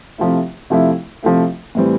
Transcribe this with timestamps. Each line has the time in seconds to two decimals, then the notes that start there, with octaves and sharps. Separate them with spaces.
0.18 C3 F3 A3 E4
0.70 C3 F3 A3 E4
1.23 C3 F3 A3 E4
1.75 A2 E3 G3 C4